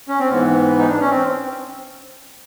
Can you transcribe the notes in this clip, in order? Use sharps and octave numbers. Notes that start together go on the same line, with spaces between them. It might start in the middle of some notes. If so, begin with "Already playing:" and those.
C#4
C4
G#2 E3 B3
D#4
D4
C#4
C4